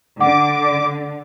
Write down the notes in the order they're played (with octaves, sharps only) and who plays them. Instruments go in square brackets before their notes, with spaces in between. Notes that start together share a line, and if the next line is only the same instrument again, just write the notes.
[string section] D3 [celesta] F#5 [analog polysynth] D6